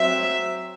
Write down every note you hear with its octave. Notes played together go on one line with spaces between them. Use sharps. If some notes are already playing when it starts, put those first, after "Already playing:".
Already playing: F#3 C4 E5